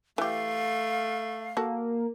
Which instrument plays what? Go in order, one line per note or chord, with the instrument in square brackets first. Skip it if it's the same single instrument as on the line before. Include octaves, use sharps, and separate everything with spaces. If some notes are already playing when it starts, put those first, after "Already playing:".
[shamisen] E3 G4 [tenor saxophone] A3 [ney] F5
[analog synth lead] A#3 [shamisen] F#4 A4